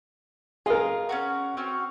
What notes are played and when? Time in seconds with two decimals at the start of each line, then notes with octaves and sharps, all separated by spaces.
0.66 F4 G#4 A#4 D#5
1.09 C#4 D4 F#4
1.57 C4 C#4 F#4